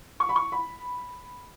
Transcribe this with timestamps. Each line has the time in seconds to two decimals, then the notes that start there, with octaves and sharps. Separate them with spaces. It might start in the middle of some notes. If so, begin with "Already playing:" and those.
0.20 C#6
0.29 B5
0.36 C#6
0.52 B5